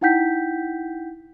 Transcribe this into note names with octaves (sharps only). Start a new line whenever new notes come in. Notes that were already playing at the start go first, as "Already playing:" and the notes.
D#4 E4 F#5 G5 G6 B6